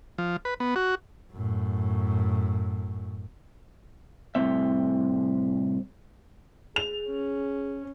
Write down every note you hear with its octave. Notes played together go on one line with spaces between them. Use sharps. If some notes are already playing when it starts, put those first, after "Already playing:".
F3
B4
B3
F#4
F#2 A2
C2 A2 C4 E5
G#4 F7
C#4